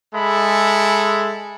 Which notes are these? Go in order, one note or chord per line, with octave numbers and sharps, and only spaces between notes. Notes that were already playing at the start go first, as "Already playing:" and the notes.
G#3 A4 E5 B5